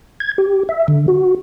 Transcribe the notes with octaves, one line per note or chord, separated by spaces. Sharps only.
G#6
G4
E5
D3
F#4